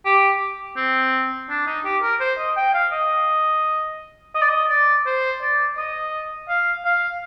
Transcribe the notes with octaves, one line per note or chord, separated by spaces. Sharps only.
G4
C4
D4
D#4
G4
A#4
C5
D#5
G5
F5
D#5
D#5
D5
D#5
D5
C5
D5
D#5
F5
F5